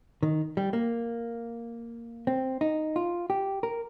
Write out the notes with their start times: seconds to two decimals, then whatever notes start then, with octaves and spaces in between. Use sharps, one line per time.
0.23 D#3
0.57 G3
0.73 A#3
2.27 C4
2.61 D#4
2.96 F4
3.30 G4
3.63 A#4